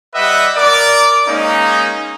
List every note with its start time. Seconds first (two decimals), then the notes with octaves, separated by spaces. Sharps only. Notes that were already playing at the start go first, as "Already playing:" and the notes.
0.15 G3 G4 B4 D#5 E5 F#5
0.56 A#4 D5 D6
1.28 G#3 A#3 C#4 D#4